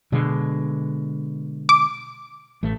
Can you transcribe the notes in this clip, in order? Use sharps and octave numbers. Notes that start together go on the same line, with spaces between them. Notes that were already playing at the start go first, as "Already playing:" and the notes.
B2 D3 G#3
D6
A1 A3